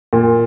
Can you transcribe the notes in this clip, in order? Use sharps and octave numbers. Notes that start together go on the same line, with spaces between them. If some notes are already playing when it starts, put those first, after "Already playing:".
A#2